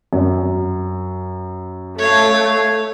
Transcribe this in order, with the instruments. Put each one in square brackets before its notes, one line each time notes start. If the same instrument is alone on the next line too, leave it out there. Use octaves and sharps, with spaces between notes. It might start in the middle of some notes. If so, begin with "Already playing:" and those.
[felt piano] F#2
[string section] A3 [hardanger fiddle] C#5 F5